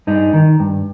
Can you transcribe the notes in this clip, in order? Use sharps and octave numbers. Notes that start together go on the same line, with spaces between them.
G2 D#4
D#3
G2